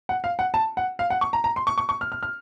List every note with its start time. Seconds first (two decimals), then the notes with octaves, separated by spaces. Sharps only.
0.09 F#5
0.24 F5
0.39 F#5
0.54 A5
0.77 F#5
0.99 F5
1.10 F#5
1.21 C#6
1.33 A#5
1.44 A#5
1.56 C6
1.67 C#6
1.78 C#6
1.89 C#6
2.01 F6
2.12 F6
2.23 F6